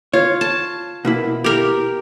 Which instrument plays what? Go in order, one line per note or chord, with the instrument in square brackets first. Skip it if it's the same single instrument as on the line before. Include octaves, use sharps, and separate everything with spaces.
[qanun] F4 [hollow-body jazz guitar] C#5
[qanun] A5
[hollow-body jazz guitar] B2 A#3 E4
[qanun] G4 A#4